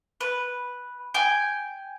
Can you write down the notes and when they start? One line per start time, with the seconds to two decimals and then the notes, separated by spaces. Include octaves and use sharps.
0.21 B4
1.14 G5 G#5